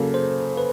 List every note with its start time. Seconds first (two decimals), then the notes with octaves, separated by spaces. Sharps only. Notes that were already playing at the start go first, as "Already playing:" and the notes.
Already playing: C#3 F#3 A#3 A4
0.14 C5
0.57 B4